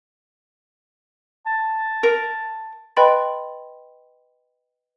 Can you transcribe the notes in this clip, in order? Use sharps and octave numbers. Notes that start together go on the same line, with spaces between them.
A5
A#4
B4 D#5 G5 B5 C6 A6